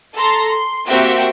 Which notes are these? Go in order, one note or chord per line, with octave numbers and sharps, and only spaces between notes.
A4 A#5 C6
C6
A#3 C4 F#4 G4 E5 G5